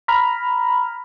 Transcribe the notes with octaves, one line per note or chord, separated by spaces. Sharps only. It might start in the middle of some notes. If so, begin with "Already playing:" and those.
A#5 B5 F6